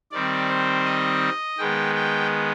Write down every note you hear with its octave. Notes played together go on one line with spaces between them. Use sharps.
D#3 G3 C4 D5
C5
D#5
D#3 G#3 B3 G5
G5